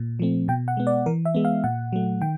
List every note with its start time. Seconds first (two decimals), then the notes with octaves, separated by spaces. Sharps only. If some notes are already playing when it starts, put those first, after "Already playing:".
Already playing: A#2
0.19 F3 A3 C4
0.48 B2 G5
0.68 F#5
0.77 G#3 B3
0.87 D5
1.06 E3 A#4
1.25 E5
1.35 G#3 B3
1.45 F5
1.64 A#2 F#5
1.93 F#3 A3
2.21 D#3 G5